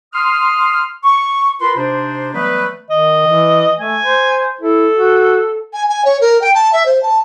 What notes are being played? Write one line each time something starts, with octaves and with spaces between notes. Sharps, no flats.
C6 D#6 F6
C#6
F4 A#4 B4 B5 C6
C3 D4 D#4 C5
E3 F#3 G3 A3 B3 B4
D#3 D#5
E3
A3 G#5
C5
E4 A4
F#4
G#5
G#5
C#5
A#4
G5
A5
E5
C5
A5